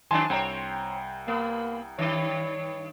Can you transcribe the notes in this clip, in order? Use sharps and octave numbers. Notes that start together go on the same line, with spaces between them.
D#3 F#3 D4 G#5 A5 C6
C2 C4 C#5 G5 A#5
A#3 B3
G2 D#3 C#5